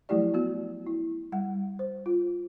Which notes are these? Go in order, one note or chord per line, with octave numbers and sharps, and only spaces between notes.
F3 F#3 A3 E4 G4 D5
B3 F#4
E4
G3 F#5
C5
F4